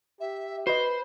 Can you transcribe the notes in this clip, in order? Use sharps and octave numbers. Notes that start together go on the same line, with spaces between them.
G4 E5
F#4 B4 C5 D#5 B5